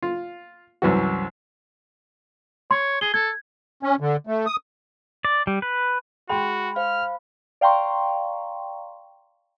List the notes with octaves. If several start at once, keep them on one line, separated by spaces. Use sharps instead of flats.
F4
C2 F#2 E3 F#4
C#5 C6
G#4 G7
A4 G#6
C#4
D3
A3
D#6
D5
G3
B4
G#3 F#4 G5 B5 C6
C5 F5 F6
D5 F5 G5 A#5 C6 C#6